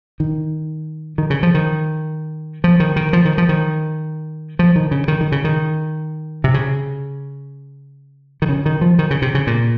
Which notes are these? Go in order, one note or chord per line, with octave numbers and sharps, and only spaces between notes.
D#3
D#3
C#3
F3
D#3
F3
D#3
D#3
F3
D#3
F3
D#3
F3
D#3
C#3
D#3
D#3
C#3
D#3
C3
C#3
D#3
C#3
D#3
F3
D#3
C#3
C3
C#3
A#2